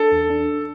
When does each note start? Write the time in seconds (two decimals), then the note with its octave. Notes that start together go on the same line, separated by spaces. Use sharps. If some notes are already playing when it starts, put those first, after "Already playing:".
Already playing: D4 A4
0.12 E2
0.30 D4